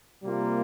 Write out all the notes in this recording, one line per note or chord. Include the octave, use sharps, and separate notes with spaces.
C3 G3 A#3 F4